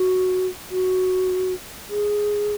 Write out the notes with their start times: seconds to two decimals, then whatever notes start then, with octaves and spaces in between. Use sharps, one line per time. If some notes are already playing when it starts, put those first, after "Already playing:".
Already playing: F#4
0.71 F#4
1.90 G#4